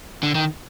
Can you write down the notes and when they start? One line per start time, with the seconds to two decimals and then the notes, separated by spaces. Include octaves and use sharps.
0.23 D3
0.35 D#3